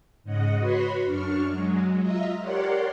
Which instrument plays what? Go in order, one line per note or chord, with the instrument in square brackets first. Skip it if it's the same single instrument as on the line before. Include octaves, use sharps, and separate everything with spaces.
[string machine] G#2 C#3 D#5 F#5
F#4 B4 C#5 B5 C6 C#7
F#2 D4 C#6 F6
F#3 G#3
F4 D#5 E5 A#5
G4 A#4 C#5 D5 F#5 C6